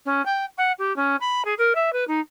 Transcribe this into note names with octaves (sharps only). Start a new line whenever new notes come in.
C#4
G5
F#5
G4
C#4
B5
G#4
A#4
E5
B4
D#4